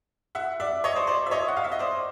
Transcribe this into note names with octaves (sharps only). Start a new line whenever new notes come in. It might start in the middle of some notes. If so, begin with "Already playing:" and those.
E5 F#5
D5 E5
C#5 D#5
C5 D5
C5 D5
E5
C#5 D#5
F#5
F5
E5
D#5
C5 D5